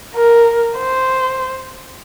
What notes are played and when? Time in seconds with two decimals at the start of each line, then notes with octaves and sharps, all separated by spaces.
0.15 A#4
0.77 C5